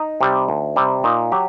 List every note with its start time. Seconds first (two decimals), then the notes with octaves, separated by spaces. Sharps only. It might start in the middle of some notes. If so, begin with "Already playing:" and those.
Already playing: D#4
0.21 C3 G3
0.49 D2
0.76 C3 G3
1.04 A#2 D#4
1.32 F#3 G4